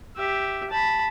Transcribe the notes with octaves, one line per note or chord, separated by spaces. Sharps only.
G4 E5
A5 B5